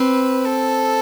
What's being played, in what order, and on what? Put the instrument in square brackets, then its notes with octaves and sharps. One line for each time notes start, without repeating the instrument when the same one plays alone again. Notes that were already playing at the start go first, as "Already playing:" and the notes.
Already playing: [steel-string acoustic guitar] C4 [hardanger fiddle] B4
[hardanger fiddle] A4